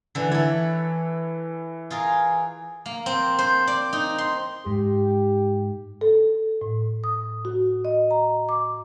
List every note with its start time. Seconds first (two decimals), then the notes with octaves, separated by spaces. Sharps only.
0.15 D3 E3
0.32 E3 A4 C#5
1.90 F4 G#4 A#4
2.86 A#3
3.06 C4
3.39 C5
3.67 D5
3.93 D#4
4.18 C6
4.66 G#2 G4
6.01 A4
6.61 A2
7.04 D#6
7.45 F#4
7.85 D#5
8.11 A#5
8.49 D6